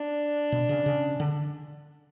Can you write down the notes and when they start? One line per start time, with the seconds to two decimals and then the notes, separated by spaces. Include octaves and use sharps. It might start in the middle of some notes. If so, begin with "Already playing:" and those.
Already playing: D4
0.52 B2
0.69 C#3
0.86 C#3
1.20 D3